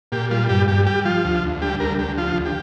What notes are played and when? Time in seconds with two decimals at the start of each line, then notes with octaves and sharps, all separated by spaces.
0.12 A#2 G4
0.31 G3 F4
0.49 G2 G4
0.68 G2 G4
0.86 G3 G4
1.05 F3 F4
1.25 D2
1.43 D2
1.62 G3 G4
1.80 D2 A#4
1.99 D2 G4
2.18 F3 F4
2.36 D2
2.45 G4